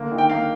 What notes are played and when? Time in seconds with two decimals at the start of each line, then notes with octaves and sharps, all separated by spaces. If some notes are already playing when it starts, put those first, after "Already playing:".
Already playing: D3 A#3
0.12 D#3
0.18 G5
0.30 A#3 F5